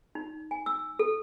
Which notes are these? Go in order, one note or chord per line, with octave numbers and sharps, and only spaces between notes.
D#4
G#5
E6
A4